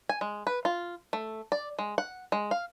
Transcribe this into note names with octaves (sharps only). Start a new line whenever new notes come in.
G#5
G#3
B4
F4
A3
D5
G#3
F#5
G#3
F5